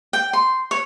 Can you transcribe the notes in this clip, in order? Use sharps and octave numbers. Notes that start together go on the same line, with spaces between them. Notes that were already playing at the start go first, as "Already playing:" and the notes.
G5
C6
C#5